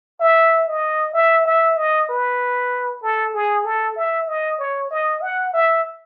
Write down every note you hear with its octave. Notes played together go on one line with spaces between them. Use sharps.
E5
D#5
E5
E5
D#5
B4
A4
G#4
A4
E5
D#5
C#5
D#5
F#5
E5